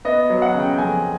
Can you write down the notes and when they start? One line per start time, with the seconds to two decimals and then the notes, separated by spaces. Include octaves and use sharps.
0.05 B3 D#5
0.30 F#3
0.42 F#5
0.54 C#3
0.60 G5
0.73 G5
0.78 F2 G#5